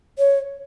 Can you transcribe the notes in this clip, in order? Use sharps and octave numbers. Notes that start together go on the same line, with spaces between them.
C#5